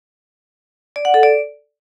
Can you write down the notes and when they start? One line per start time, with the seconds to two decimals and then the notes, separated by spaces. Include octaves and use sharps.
0.96 D5
1.05 F#5
1.14 A4
1.23 D5